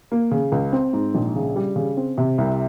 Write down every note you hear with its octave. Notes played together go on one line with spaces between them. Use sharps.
A#3
C#3
C#2
C4
G#2
A#1
C#3
G3
C#3
C4
C3
C2